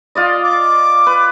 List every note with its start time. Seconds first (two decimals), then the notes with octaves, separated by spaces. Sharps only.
0.15 F4 D5 D#5
0.44 D6
1.06 B4